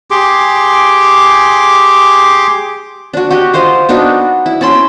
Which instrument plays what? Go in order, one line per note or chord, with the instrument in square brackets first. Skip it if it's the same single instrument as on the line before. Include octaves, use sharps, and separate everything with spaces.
[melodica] G4 G#4 C6 D6
[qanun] D4 F#4
F#4 G4 D#5
F4 C5 D#5 F5
B3 D4 D#4 F#4
E4
C#4 A5 B5 C6